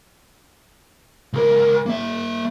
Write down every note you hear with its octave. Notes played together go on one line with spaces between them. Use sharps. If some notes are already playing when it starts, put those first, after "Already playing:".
C#2 A#4
A#3 E5